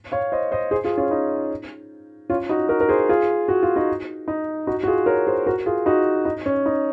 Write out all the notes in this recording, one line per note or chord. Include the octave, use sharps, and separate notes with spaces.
C#5 F5
C5 D#5
C5 D#5
G#4 C5
F4 G#4
C#4 F4
D#4
C#4 F4
D#4 F#4
F#4 A#4
A#4
G#4 C5
F4 G#4
F#4
F4
D#4 F#4
D#4
D#4 F#4
F#4
F4 G#4
A#4 C#5
G#4 C5
F#4 A#4
F4 G#4
D#4 F#4
D#4
C#4
D#4